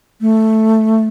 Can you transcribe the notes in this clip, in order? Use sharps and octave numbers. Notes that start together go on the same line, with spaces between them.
A3